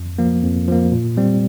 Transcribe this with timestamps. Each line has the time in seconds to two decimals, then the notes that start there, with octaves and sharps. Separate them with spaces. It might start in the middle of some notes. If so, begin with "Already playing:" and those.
Already playing: F2
0.19 F3 A#3
0.42 F2
0.68 F3 A#3
0.92 A#2
1.17 G3 C4